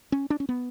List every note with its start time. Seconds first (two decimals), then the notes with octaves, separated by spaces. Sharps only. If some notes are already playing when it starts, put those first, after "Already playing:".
0.12 C#4
0.30 D4
0.40 C#4
0.49 B3